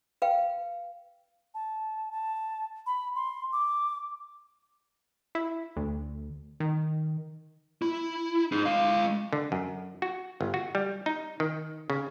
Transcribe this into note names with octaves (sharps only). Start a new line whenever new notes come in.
B4 F5 G5
A5
A5
B5
C6
D6
E4
D2
D#3
E4
D#4 G#4
G#3 F5
D3
F#2
F#4
G1
F#4
G3
D#4
D#3
C#3